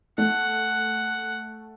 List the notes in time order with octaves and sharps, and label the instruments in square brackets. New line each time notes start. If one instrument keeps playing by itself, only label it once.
[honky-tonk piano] A3 [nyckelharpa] F#5